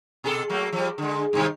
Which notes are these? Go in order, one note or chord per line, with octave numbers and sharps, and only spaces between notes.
B2 G#4 A4
F#3 A3 A#3
F3 G3
D3 G#3
G2 C3 D#3